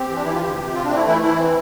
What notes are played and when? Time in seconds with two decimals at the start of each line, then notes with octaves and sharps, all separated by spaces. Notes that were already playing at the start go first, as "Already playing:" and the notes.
Already playing: C4 G4
0.09 E3
0.15 D4
0.25 E3 E4
0.33 F4
0.41 D2 G4
0.58 C3
0.73 C4 F4
0.84 D4
0.90 A3
0.96 E4
1.06 E3 E4
1.21 E3 E4
1.38 C4